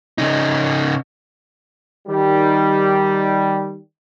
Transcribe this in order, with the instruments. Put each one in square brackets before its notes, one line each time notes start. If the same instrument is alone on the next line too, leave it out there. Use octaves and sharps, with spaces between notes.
[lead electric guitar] C#3 D#4
[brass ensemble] D#3 G3